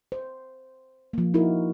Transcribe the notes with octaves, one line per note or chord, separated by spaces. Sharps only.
C5
F3 A#3
D#4 E4 F#4 A#4